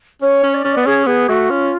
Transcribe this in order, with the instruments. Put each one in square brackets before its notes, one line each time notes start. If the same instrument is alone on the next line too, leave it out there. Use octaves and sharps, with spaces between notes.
[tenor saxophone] C#4 [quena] C#5
[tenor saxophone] C#4
[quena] D5
[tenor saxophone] C#4
B3
[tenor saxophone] C#4 [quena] G#4
[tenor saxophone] B3 [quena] G#4
[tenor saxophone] A3 [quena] F#4
[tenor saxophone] C#4 [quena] F4